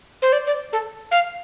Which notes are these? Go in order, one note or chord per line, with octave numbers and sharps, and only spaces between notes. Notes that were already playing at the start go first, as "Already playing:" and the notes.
C5
D5
D5
A4
F5